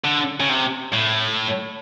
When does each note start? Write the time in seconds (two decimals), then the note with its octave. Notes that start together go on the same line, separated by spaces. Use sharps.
0.04 D3
0.40 C#3
0.49 C3
0.92 A2